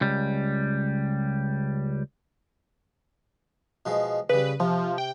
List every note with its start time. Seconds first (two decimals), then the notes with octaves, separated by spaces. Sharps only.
0.01 C#2 G3
3.86 B2 F3 G#3
4.29 C#3 G3 B4
4.60 C3 F3
4.98 G5